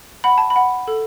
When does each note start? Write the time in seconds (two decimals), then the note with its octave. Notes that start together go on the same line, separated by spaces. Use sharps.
0.24 F#5 B5
0.38 A5
0.50 B5
0.56 F#5
0.88 A4